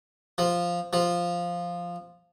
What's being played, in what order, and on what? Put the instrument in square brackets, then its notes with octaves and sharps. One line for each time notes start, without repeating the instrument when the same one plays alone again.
[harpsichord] F3
F3